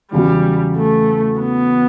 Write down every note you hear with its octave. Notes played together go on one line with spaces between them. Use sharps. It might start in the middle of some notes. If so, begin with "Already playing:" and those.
E2 C#3 F#3 G3
A3
B3